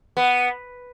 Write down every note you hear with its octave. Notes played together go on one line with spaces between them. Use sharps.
B3